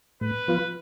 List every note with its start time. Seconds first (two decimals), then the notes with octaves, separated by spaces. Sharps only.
0.21 A2 B4
0.48 F3 B3 F4